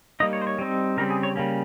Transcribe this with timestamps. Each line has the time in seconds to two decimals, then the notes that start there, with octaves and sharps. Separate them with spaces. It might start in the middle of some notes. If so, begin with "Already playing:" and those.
0.20 G3 A#3 D#4 D#5
0.33 C#5
0.41 C5
0.47 C#5
0.58 G3 C4 D#4
0.97 C#3 G3 C4 A#4
1.10 G#4
1.23 C#5
1.36 C#3 G3 A#3 C#4